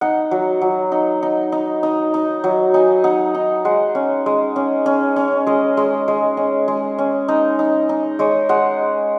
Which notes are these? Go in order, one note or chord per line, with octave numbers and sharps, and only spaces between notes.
D#4 F#5
F#3
F#3
D#4
D#4
D#4
D#4
D#4
F#3
D#4 G#5
D#4 F#5
D#4
G#3 F#5
C#4
G#3
C#4
C#4
C#4
G#3 D#5
G#3
G#3
C#4
G#3
C#4
D#4
D#4
D#4
G#3 C#5
G#3 F#5